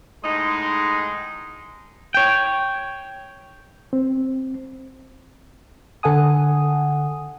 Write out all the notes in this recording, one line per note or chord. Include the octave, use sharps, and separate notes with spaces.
A2 G#3 D#4 D#5 F#5 C6
C#5 G5
C4
D3 A4 F#5 G#5 D#6